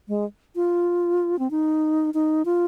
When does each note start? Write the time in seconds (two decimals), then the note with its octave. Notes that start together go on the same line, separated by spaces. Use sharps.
0.08 G#3
0.56 F4
1.39 C4
1.51 D#4
2.14 D#4
2.45 F4